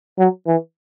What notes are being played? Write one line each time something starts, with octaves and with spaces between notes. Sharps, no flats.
F#3
E3